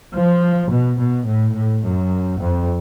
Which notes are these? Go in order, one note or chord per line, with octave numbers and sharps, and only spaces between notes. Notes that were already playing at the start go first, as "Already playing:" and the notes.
F3
B2
B2
A2
A2
F#2
F2